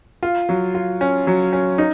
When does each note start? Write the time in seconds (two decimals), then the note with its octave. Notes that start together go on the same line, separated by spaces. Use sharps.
0.23 F4
0.49 F#3
0.75 F4
1.01 C#4
1.27 F#3
1.53 C#4
1.78 D#4